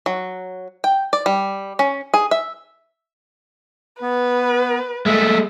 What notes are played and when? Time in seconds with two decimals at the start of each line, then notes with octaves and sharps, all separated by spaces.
0.06 F#3
0.84 G5
1.13 D5
1.26 G3
1.79 C#4
2.14 G#4
2.31 E5
4.02 B3 B4
5.06 G#3 A3 E5